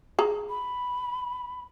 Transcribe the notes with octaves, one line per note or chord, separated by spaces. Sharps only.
G#4 A#5
B5